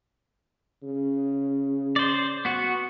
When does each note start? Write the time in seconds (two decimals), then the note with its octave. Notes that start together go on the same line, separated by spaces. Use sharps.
0.83 C#3
1.96 C5 D5
2.45 B3 F#4